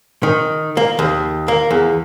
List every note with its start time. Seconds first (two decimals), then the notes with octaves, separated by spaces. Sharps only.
0.23 D#3
0.77 A#3
0.99 D#2
1.48 A#3
1.71 E2